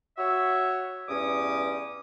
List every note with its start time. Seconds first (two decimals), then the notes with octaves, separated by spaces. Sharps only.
0.18 F#4 C#5 E5
1.09 E2 G2 C#4 D6 D#6